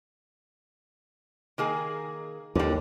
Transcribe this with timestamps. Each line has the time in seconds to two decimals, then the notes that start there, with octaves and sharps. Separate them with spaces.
1.58 D#3 A#3 G#4
2.55 D#2 D3 G3